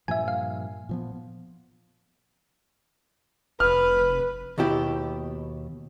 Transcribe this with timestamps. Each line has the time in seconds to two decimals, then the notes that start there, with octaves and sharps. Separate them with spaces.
0.08 G2 A#2 F3 E5 G#5
0.28 F5
0.89 A#2 F3 B3
3.60 F1 B4 F6
4.58 D#2 B2 E4 G4